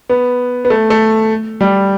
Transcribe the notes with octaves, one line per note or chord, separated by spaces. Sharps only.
B3
B3
A3
A3
G3